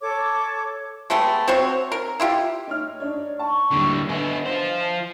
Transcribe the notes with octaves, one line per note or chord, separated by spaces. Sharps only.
A4 C#5 D6
G#3 A3 B3 G4
C4 F#4 C5 C#5
A#4
E4 F4 G4
D#4 C#5 F6
D4 D#4 C#5 D5
A5 C#6
D#2 A2 D3 G3
D3 B3 D#5 E5 G#5
F4 C5